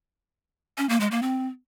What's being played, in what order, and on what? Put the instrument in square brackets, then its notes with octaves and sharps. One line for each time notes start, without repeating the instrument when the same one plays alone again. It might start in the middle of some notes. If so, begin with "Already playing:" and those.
[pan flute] C#4
A#3
G#3
A#3
C4